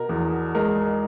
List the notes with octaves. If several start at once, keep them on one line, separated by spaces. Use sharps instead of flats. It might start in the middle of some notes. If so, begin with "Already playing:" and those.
Already playing: B2 A#4
E2
G#3 A#4